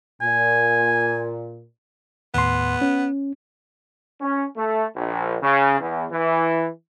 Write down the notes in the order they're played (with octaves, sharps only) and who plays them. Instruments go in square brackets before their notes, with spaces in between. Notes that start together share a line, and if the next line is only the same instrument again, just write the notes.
[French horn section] A#2 [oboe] G#5
[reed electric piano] D#2 A2 C6 [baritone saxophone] B3
[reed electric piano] C#4
[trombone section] C#4
A3
A#1
C#3
E2
E3